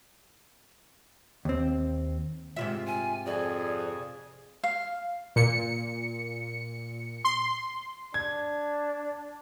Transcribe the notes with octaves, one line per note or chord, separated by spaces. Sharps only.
D#2 C4
G#2 C3 F4 E5
G#5
F2 G#4 D5
F5
A#2 C#7
C6
D4 G#6